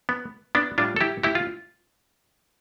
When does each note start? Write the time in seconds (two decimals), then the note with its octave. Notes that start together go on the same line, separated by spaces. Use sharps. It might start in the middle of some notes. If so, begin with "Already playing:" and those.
0.09 B3
0.55 B3 D4
0.78 A2 G3 D4 F4
0.96 A4
1.01 E4 G4
1.23 E4 G4
1.35 F4